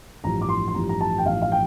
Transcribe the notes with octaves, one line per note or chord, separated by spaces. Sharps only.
A1 G2 F3 A#5
D6
C6
C6
A1 G2 F3 A#5
A#5
A5
G5
A1 G2 F3 F5
F5
G5